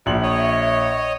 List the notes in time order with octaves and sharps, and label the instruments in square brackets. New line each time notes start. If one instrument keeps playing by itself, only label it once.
[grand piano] A#1 F#7 [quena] E5
[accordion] C#5 D#5